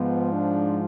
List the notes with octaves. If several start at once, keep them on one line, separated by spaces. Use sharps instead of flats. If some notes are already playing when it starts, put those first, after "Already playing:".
Already playing: G#2 F3 B3
D4